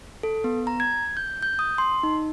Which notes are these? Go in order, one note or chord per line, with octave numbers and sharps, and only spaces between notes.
A4
B3
A#5
G#6
G6
G6
D#6
C6
D#4